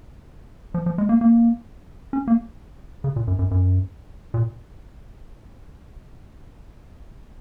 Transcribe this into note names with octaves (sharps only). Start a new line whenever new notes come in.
F3
F3
G#3
A#3
A#3
C#4
A#3
C#3
A#2
F#2
F#2
F#2
A#2